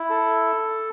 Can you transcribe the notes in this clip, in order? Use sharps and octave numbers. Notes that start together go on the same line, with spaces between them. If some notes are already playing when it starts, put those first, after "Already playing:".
Already playing: E4
A4